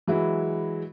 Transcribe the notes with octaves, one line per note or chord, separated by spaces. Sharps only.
E3 F#3 G#3 E4